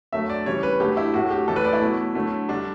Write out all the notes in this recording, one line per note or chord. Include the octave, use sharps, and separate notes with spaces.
D3 F#3 A3 E5
D5
C#3 E3 G3 C#5
B4
D3 F#3 A3 G4
E4
A2 F#3 A3 F#4
G4
A2 E3 A3 A4
B4
D5
E4
B2 F#3 A3
D3 F#3 A3
D3 G3 D4